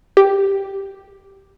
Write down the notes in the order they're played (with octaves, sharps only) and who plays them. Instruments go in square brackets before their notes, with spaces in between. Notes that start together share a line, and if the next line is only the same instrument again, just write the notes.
[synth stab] G4